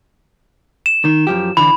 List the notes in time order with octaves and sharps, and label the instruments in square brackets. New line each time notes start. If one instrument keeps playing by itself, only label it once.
[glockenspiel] E7
[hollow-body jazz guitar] D#3
F#2 F3 G4
[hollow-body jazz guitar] D3 E3 [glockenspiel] B5